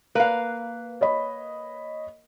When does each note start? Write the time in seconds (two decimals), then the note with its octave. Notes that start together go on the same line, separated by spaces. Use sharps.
0.15 A#3 B4 F5
1.01 C#5 D#5 B5